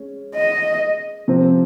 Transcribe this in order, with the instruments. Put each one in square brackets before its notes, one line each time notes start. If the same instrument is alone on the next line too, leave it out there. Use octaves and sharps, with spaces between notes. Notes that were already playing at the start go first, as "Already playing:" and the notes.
Already playing: [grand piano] G#3 C#4
[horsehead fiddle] D#5
[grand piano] C3 F3 C4